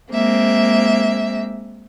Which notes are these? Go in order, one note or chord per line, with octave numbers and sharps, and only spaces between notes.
G#3 A#3 C4 E5